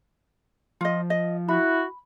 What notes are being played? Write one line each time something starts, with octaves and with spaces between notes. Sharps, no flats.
F3 F4 D#5
D#5
E4 F#4 B5